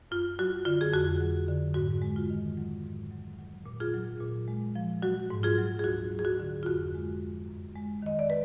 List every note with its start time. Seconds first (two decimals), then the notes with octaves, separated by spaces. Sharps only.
0.11 F#2 F4
0.39 F#3 F#4
0.65 D3 F4
0.81 G#4
0.93 F2 F#4
1.21 F#3
1.48 D3
1.74 G#2 F#4
2.02 G#3
2.16 F4
2.30 D#3
2.57 F#3
2.85 G#2
3.11 F#3
3.39 F#3
3.66 A#2
3.80 F4 G#4
3.94 F#3
4.20 A#2
4.48 G#3
4.76 F3
5.02 F#3 F#4
5.30 G#2
5.43 F4 G#4
5.58 F#3
5.79 G#4
5.84 D2 F#4
6.12 F#3
6.19 G#4
6.25 F#4
6.40 D3
6.63 F4
6.66 F2 F#4
6.94 G#3
7.22 F3
7.48 F#2
7.76 G#3
8.02 D#3 D#5
8.19 D5
8.30 B4